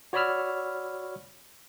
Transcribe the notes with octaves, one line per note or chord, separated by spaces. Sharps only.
F#4 C#5 D5 B5 E6 F6